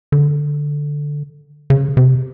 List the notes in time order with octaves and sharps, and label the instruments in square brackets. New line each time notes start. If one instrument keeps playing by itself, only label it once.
[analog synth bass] D3
C#3
C3